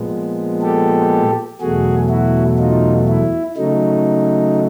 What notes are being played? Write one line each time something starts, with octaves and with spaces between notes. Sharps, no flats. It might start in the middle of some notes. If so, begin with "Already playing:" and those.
Already playing: A#2 F3 G#3 B3
G4 A4
E2 B2 F#3 A3 F#4 G#4
E4 F#4
D#4 F4
E4
C#3 F#3 A3 D#4